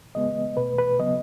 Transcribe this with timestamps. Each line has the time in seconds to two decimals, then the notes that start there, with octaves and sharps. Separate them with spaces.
0.15 C#3 G#3 B3 D#5
0.57 B2 A3 B4
0.78 B4
0.99 C#3 F#3 B3 D#5